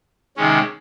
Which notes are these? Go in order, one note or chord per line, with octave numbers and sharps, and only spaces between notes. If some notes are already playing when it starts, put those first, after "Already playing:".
C3 D#3 G#3 C#4